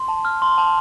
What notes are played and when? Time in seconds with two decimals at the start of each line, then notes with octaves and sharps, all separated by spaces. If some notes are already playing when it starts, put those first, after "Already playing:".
Already playing: C6
0.08 A5
0.25 F6
0.42 C6
0.58 A5